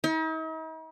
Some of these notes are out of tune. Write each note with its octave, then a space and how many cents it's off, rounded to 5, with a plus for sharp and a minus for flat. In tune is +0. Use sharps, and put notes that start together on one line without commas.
D#4 +45